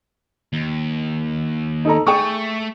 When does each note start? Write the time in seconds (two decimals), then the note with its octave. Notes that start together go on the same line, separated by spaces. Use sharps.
0.53 D#2
1.85 D#4 A4 A#5
2.07 A3 G#4 G5 C#6